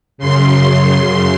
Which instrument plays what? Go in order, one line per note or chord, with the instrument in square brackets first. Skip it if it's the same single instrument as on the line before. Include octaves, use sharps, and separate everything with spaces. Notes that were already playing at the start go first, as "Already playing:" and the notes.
[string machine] F#2 C#3 C6